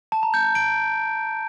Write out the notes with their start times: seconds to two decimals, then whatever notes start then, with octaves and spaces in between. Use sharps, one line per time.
0.12 A5
0.23 A#5
0.34 G6
0.44 G6
0.55 D7